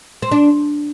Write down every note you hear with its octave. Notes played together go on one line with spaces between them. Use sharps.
C4
D4